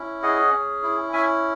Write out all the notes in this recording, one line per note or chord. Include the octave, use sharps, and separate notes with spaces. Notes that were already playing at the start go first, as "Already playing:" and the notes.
Already playing: C#4 E4
G#4 D#5 F#5
C#4
E4
C#4 E5 G#5